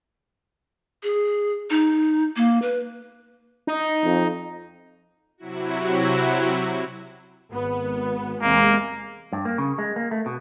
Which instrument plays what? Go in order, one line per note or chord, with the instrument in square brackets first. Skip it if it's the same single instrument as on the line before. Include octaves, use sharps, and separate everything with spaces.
[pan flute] G#4
D#4
A#3
B4
[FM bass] D#4
[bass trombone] F2
[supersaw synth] C3 F#3 E4 F#4
[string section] G#1 B3
[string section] E2 C3 G#3 [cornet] A#3
[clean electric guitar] G2
A#3
C#3
G#3
A#3
A3
B2